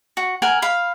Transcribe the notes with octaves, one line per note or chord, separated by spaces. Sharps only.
F#4
A#4 F#5 G#5
F5 B5